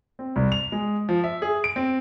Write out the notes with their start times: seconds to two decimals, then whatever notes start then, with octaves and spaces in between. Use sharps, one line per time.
0.19 C4
0.36 C2
0.52 F7
0.72 G#3
1.09 F3
1.24 E5
1.42 G#4
1.64 D7
1.76 C4